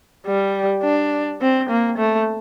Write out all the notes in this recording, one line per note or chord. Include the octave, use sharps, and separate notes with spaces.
G3
D4
C4
A#3
A3